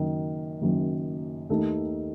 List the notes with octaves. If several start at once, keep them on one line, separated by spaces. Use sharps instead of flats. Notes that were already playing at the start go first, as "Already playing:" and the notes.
Already playing: F#1 F#2 D#3
F#1 F#2 D#3
D#2 D#3 A3 D#4 A4